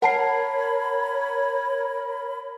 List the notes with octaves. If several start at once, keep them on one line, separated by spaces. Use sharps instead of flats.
A#4 C#5 F#5 A5 B5 C7